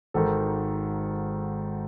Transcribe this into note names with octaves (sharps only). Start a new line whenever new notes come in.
G#1 G#2 D#3 A4